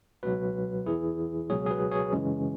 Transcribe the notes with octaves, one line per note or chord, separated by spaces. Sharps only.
C#2 B2 F#3 F#4 B4
E2 E3 E4 G#4
C#2 B2 F#3 G#4 C#5
G#4
F#4 B4
G#4 C#5
F#2 C#3 E3 G#3 C#4